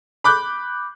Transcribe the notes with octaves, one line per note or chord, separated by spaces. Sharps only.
B5 D6 F#6 G6